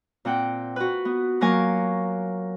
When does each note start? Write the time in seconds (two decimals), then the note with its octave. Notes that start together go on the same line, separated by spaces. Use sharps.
0.25 A#2 C4 F#5 G5
0.76 F#4 B4
1.05 B3
1.41 F#3 A#3 A#4 F5 G#5 C#6